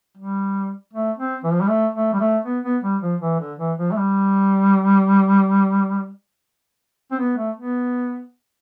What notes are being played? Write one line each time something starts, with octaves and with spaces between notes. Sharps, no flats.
G3
A3
C4
E3
F3
G3
A3
A3
G3
A3
B3
B3
G3
F3
E3
D3
E3
F3
A3
G3
C4
B3
A3
B3